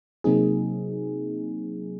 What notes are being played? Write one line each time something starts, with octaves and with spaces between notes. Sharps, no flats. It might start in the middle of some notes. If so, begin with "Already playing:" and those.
C3 F#3 A#3 C4 D#4 G#4